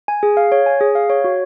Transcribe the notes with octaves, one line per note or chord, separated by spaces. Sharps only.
G#5
G#4
F5
C#5
G#5
G#4
F5
C#5
F#4